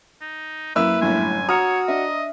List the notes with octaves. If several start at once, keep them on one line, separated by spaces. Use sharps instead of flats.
D#4
F#2 A#3 E4 B4 E6
G1 F#2 A2 G#5
F#4 C#5 A#5 D#6 F6
D4 D#5 E5